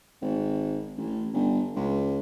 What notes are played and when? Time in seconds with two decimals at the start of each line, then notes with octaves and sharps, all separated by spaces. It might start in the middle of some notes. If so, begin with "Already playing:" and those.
0.22 G#1
0.97 A1
1.33 G1
1.76 C#2